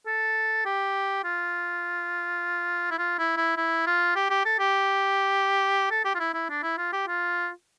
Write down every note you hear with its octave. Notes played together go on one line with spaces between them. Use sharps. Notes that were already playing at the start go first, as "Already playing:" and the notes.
A4
G4
F4
E4
F4
E4
E4
E4
F4
G4
G4
A4
G4
A4
G4
F4
E4
E4
D4
E4
F4
G4
F4